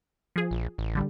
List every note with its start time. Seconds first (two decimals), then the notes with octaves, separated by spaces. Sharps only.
0.36 F3 G#4
0.51 A#1
0.78 A1
0.95 D3 G3